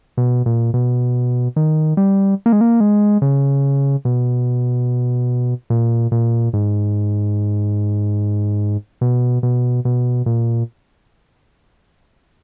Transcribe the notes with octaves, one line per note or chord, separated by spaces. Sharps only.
B2
A#2
B2
D#3
G3
A#3
G#3
A#3
G#3
C#3
B2
A#2
A#2
G#2
B2
B2
B2
A#2